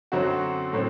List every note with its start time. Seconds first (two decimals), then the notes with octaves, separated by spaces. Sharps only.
0.12 F#2 D3 F#3 C4 F#4
0.73 A2 F#3 C4